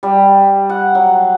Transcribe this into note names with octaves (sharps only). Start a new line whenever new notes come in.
G3
F#5
F#3